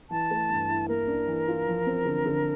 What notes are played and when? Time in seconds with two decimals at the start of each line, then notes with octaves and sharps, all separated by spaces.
0.10 E3 A5
0.31 A3
0.50 G2
0.69 E4
0.89 A#3 A#4
1.08 D4
1.28 E3
1.48 F4
1.67 F3
1.86 C4
2.05 D3
2.26 D3